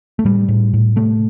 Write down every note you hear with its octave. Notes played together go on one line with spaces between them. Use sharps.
A3
A2 G3
A2
A2
C3 A3